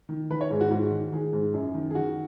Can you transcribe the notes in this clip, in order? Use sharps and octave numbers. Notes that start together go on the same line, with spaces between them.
D#3
D#3 B4
C#5
G#2 G#4
F#4
G#2 F#4
D#3
D#3 G#4
G#2
F#2
D#3
G#4
D#3 F#4